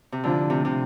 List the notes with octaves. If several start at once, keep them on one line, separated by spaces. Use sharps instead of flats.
C3
A2 D3 F3 A3 D4 F4
C3
C3